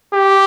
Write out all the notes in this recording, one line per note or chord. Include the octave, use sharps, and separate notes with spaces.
G4